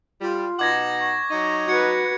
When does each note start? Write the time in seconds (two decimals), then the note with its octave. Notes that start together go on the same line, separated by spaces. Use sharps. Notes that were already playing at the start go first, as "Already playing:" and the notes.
0.21 G3 F4
0.59 B2 D#4 F#5 D6 G#6 A#6
1.01 C#6
1.31 F#3 D#4
1.68 F#4 B4 G#6 C#7